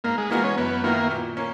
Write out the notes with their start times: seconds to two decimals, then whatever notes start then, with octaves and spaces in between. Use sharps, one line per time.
0.04 G#2 A#3
0.18 G#3
0.30 E3 G#3 A#3 B3 F#4
0.44 C#4
0.57 F#2 B3
0.84 D#3 F#3 A#3 B3 E4
1.11 A#2
1.37 A#3 C#4